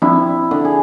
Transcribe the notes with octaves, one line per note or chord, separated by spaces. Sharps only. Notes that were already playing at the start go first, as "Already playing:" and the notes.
F3 C4 D4 E4
D3
G#4